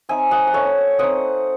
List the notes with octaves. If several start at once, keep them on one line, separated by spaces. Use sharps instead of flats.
C4 D#4 E5 G#5
D#5 F#5
F#5
A3 C#5 E5
C4 D#4 D#5 F#5